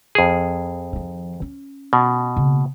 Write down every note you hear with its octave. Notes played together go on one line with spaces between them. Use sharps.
F2 G#4
D#3 F3
C#4
B2
C#3 A#3